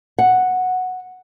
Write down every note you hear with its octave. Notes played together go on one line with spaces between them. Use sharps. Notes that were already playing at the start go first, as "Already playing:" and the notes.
F#5